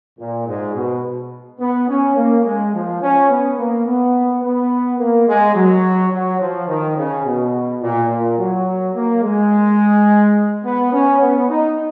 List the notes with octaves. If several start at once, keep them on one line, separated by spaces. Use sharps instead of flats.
A#2
G#2
B2
B3
C#4
A#3
G#3
F3
C#4
B3
A#3
B3
B3
A#3
G#3
F#3
F#3
F3
D#3
C#3
B2
A#2
A#2
F#3
A#3
G#3
B3
C#4
B3
D#4